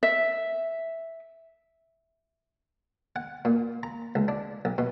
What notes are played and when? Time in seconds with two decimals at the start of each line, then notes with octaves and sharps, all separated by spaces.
0.03 E5
3.16 F#5
3.45 A#2
3.83 A#5
4.15 C#2
4.28 D4
4.65 B1
4.78 B2